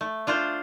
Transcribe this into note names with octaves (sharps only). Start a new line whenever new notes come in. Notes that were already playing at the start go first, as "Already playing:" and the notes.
A3
D4 F4 C5